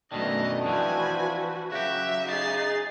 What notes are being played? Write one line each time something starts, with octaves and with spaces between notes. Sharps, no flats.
F#2 B2 D#3 E3 A3 D4 D#5
E3 F3 C4 F#4 B4 G#5
C#3 F#3 F#4 G4 E5
D#4 G#4 A6 C7